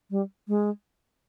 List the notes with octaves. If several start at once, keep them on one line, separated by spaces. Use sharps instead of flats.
G3
G#3